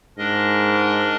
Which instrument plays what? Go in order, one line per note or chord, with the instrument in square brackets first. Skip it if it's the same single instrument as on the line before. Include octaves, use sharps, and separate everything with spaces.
[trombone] G#2 [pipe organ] D4 A#4 D#5